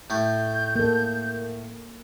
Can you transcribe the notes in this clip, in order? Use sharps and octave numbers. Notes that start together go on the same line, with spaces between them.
A2 A3 G6
A#3 A4